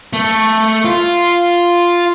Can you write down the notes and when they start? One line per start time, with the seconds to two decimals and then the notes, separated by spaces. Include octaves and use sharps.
0.13 A3
0.85 F4